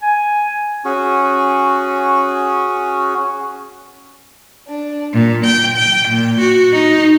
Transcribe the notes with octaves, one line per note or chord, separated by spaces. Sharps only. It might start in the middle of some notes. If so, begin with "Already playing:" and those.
G#5
C#4 F#4 G#4
D4
A#2
G5
G5
A#2
F#4
D#4